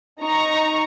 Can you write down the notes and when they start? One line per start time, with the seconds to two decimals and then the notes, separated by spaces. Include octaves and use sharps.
0.21 D#4 A#5 C#6